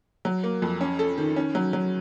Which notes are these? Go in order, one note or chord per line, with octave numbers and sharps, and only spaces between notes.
F#3
A#3
F2
C#4
A4
D#3
C#4
F#3
F#3